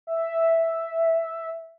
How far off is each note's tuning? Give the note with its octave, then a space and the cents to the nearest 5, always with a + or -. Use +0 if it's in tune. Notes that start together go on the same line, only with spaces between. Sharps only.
E5 +0